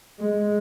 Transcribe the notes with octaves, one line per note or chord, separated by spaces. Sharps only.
G#3